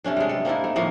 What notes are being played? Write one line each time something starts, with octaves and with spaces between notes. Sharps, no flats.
C3 A3 C#4 D4
G3 G#3
A4
A#3 C4 D#4 E4
A3
A2 D#3 F3 A#3